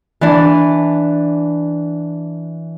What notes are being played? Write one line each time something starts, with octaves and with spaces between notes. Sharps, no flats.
E3 D4